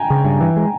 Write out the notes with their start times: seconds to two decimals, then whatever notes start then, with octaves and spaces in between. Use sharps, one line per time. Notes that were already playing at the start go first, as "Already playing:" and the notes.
Already playing: G5 G#5 A#5
0.10 C#3
0.25 G2
0.41 E3
0.56 G#3